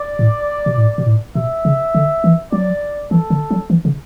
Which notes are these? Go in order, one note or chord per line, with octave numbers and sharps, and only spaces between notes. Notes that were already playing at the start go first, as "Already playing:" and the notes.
Already playing: D5
A2
B2
A2
B2
A2
B2 E5
C#3
D3
E3
F#3 D5
E3 A4
D3
F#3
E3
C#3